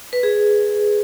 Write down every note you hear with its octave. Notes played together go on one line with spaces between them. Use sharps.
B4
G#4